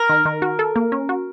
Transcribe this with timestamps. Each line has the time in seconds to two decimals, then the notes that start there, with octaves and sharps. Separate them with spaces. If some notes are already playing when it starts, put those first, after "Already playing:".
Already playing: A#4
0.09 D#3
0.25 D#3
0.42 F#4
0.59 A4
0.76 A#3
0.92 C#4
1.09 F#4